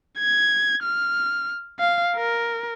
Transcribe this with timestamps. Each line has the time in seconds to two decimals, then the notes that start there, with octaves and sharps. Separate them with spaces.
0.19 G#6
0.83 F6
1.79 F5
2.15 A#4